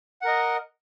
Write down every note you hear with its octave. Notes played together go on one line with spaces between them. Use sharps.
A#4 D#5 F#5